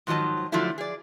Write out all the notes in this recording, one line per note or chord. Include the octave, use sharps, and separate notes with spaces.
G#2 D#3 F3 F#3 D#5 A5
D3 F3 F#3 A3 D4 E4
G#4 D5